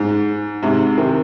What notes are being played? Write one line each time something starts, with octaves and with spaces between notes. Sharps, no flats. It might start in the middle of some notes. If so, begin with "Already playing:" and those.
Already playing: G#2
G#2 C3
C3 D#3